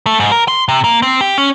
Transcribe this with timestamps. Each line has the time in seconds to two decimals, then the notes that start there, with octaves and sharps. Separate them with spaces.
0.06 A3
0.20 G#2
0.32 A#4
0.48 C6
0.68 C3
0.84 A#3
1.02 C4
1.21 G4
1.38 C#4